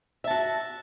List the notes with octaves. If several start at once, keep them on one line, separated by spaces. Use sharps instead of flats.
F#4 E5 A5